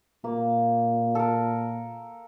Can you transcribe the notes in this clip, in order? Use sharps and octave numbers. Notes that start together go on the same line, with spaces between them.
A#2 A#3
A4 A#4